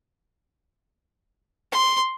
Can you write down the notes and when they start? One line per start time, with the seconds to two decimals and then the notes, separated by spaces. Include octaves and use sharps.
1.72 C6